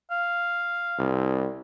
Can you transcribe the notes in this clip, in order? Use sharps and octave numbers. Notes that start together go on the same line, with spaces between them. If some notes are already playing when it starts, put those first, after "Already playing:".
F5
C2